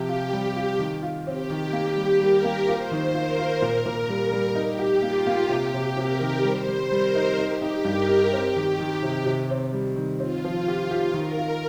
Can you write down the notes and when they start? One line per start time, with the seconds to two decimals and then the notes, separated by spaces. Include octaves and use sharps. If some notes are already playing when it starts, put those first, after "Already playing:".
Already playing: C3 F3 G4
0.09 F4
0.33 G3 G4
0.56 F4
0.79 D#3
1.03 F4
1.26 C4 G4
1.50 D#3
1.73 A#3 G4
1.96 G3
2.20 G3 A#4
2.44 A#3
2.67 F4 C5
2.91 D#3
3.14 F4 A#4
3.39 F4
3.62 A#2 A#4
3.86 A#2
4.09 G3 A#4
4.32 G3
4.55 D#4 G4
4.79 G4
5.02 A#3 F4
5.27 A#3
5.50 C3 G4
5.74 C3
5.97 C3 A#4
6.21 D#3
6.44 G3 C5
6.67 G3
6.92 G3 A#4
7.15 D#4
7.38 D#4 G4
7.62 D#4
7.85 G2 A#4
8.09 D#4
8.32 C4 G4
8.56 D#3
8.80 D#3 G4
9.02 C3
9.26 C3
9.50 C4
9.73 G3
9.96 D#3
10.20 C4 F4
10.45 F3
10.68 G4
10.91 G4
11.14 D#3 A#4
11.38 F4